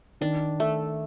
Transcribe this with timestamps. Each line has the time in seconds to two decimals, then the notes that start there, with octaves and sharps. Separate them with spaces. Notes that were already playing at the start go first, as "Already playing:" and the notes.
0.21 D#3 D4
0.60 A3